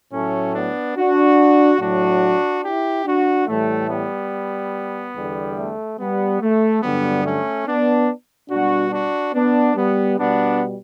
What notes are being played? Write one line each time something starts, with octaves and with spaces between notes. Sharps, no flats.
A2 F#3 A3 C#4
B3 D4
D4 F#4
A2 F#3 D4 F#4
E4 G4
D4 F#4
A2 E3 G3 A3
G3 B3
E2 D3 G3
A3
G3 B3
A3
G2 D3 F#3 G3 B3
A3 C#4
B3 D4
B2 G3 D4 F#4
D4 F#4
B3 D4
G3 B3
B2 G3 B3 D4